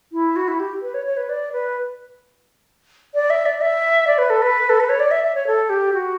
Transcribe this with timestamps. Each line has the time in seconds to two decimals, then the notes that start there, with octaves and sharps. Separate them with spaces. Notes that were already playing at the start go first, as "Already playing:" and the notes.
0.12 E4
0.36 F#4
0.48 E4
0.59 G4
0.82 B4
0.94 C#5
1.06 C#5
1.17 B4
1.29 D5
1.52 B4
3.14 D5
3.30 E5
3.46 D5
3.61 E5
4.07 D5
4.18 B4
4.30 A4
4.42 B4
4.69 A4
4.80 B4
4.89 C#5
4.99 D5
5.11 E5
5.23 E5
5.35 C#5
5.47 A4
5.69 G4
5.93 F#4